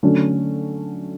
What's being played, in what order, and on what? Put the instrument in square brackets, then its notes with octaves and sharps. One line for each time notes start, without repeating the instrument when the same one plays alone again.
[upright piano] D3 F#3 A3 C#4